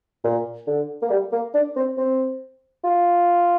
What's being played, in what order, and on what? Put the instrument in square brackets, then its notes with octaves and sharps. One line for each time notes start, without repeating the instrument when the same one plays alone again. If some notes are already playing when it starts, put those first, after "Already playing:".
[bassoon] A#2
D3
A#3
G3
A#3
D4
C4
C4
F4